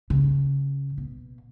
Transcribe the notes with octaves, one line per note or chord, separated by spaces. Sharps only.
C#3
B2